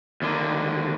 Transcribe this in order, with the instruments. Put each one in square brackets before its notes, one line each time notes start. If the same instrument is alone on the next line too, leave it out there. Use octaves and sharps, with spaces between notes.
[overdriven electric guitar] D#2 D3